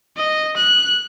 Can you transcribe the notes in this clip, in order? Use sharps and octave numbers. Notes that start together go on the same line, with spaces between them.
D#5
F#6